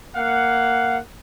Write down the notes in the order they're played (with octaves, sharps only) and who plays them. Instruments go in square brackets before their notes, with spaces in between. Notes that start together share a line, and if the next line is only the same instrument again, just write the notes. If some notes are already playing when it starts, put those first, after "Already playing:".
[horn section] A#3 F5 F#5